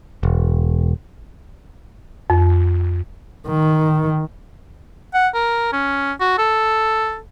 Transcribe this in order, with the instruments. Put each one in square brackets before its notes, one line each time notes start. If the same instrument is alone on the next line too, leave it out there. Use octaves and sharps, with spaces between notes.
[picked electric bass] E1
[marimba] F2
[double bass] D#3
[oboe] F#5
A#4
C#4
F#4
A4